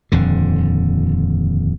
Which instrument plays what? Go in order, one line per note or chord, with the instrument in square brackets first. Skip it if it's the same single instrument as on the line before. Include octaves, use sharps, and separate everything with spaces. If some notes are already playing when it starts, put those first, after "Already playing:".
[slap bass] D#1 F2 D3